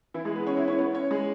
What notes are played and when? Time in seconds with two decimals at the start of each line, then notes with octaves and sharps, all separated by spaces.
0.14 E3 E4
0.25 G#3 G#4
0.35 B3 B4
0.46 C#4 C#5
0.57 E4 E5
0.68 C#4 C#5
0.78 B3 B4
0.95 C#4 C#5
1.11 G#3 G#4